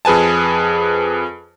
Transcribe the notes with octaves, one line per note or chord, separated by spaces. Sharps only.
F2 G#4 B4 G#5 A5